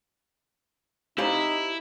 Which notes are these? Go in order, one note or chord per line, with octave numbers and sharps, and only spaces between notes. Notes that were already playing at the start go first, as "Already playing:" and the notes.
D#4 E4 G4 C5 F5